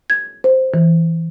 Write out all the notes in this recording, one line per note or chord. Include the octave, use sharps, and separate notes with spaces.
G#6
C5
E3